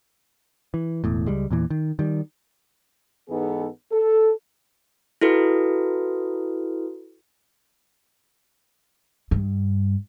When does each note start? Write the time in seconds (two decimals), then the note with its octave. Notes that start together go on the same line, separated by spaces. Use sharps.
0.74 E3
1.04 E1 E2 A2
1.27 C#2 G3 G#3
1.51 E2 A#2 E3
1.70 D#3
1.99 D#3 G3
3.29 G#2 E3 B3 D#4 G#4 A4
3.91 A4
5.21 E4 F#4 A4 B4
9.31 G2